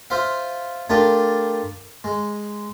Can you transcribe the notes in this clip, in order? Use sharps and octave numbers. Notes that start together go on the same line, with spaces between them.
F4 C5 E5 F5
A3 D4 F4 G4 A#4
G#3